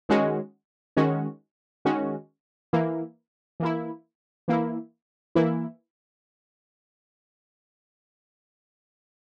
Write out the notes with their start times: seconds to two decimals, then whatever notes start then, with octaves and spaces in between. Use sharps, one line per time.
0.09 D#3 G#3 C#4 F#4
0.97 D#3 G#3 C#4 F#4
1.85 D#3 G#3 C#4 F#4
2.73 E3 A#3 E4
3.60 E3 A#3 E4
4.48 E3 A#3 E4
5.35 E3 A#3 E4